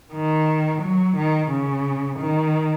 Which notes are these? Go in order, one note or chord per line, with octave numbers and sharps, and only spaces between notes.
D#3
F#3
D#3
C#3
D#3